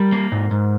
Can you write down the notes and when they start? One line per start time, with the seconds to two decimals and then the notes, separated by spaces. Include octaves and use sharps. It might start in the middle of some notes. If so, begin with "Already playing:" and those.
Already playing: G3 A#4
0.12 A#3
0.32 G#2
0.51 G#2